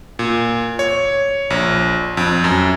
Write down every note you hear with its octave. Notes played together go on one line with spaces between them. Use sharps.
A#2
C#5
A#1
F2
F#2